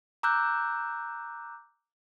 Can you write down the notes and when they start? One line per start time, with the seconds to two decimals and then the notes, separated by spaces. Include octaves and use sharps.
0.23 A#5 D6 E6 F#6 G6